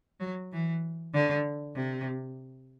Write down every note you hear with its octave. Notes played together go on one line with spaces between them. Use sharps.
F#3
E3
D3
C3